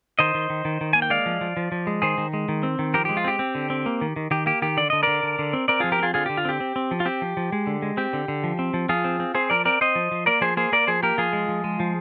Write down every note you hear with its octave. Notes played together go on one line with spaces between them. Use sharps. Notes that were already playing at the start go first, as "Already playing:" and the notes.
D#3 C5 D#5
D#3
D#3
D#3
D#3
A#3 G#5
G5
G#3 D5 F5
F3
F3
F3
F3
G#3
D#3 G#4 C5
D#3
G#3
D#3
C4
D#3
F3 G4 A#4
G#3 G4
F4
C4 G4
C4
D3
C4
A#3
D#3
D#3
D#3 G4
A#3 G4
D#3 G4
D3 D5
D3 D#5
D3 A#4 D5
D3
D3
C4
C4 A#4 D5
F3 F4 G#4
G4 A#4
C4 F4 G#4
D3 F4 G#4
D3 G4
F4
C4 G4
C4
C4
F3
F4
C4 G4
F3
F3
G#3
D3
G#3
C4 G4
D3
D3
F3
C4
F3
F3 F4 G#4
C4
C4
C4 G#4 C5
F3 A#4 D5
C4 A#4 D5
C4 C5 D#5
F3
F3
A#3 A#4 D5
F3 G#4 C5
A#3 G#4 C5
A#3 A#4 D5
F3 G#4 C5
A#3 G4 A#4
F3 F4 G#4
G#3
F3
G#3
F3